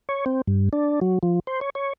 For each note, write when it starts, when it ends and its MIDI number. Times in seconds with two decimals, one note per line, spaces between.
0.09 0.25 73
0.26 0.42 60
0.47 0.69 43
0.73 1.00 62
1.01 1.19 54
1.23 1.39 53
1.47 1.60 72
1.61 1.70 73
1.75 1.93 73